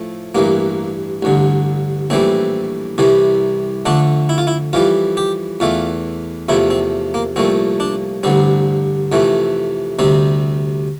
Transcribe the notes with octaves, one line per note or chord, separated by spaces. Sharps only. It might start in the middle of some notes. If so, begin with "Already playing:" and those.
Already playing: A2 F3 A3
A1 G2 E3 A#3
A1 G2 D3
A#1 A2 E3 G3 C4
C2 C3 E3 G3
F2 D3 A3 D4
E4
F4
E4
F2 E3 G3 F4
G4
E2 E3 A3 F4
E2 C3 F3 A3 E4
C4
A#3
C2 A#2 F3 A3 C4
D4
A1 G2 D3 G3 C4
F2 C3 E3 A3
D2 C3 G3 C4